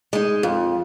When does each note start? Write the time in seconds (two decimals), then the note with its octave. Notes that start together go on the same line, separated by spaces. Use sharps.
0.13 G#3 D#4
0.43 F2